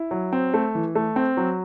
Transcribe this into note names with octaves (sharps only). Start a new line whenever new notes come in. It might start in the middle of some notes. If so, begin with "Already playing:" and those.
Already playing: E4
F#3
C4
A3
E3
A3
C4
F#3